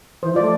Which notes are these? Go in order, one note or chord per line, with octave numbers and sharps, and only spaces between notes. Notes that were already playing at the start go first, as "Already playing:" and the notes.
E3 C5
F3 D5
A3